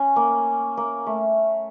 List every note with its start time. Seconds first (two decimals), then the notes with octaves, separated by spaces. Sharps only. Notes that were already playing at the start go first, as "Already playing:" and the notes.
Already playing: C#4
0.16 A#3
0.77 A#3
1.07 A3